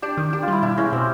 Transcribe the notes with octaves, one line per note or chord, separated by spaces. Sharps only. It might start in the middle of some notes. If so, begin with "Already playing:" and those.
D4 G4
D#3
D4 G4
F4
G3 E4
B2 E4
G#3 C#4
B2 C4